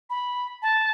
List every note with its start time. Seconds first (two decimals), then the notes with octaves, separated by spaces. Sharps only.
0.10 B5
0.62 A5